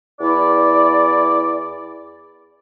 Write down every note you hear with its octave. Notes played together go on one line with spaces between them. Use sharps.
E2 E4 D5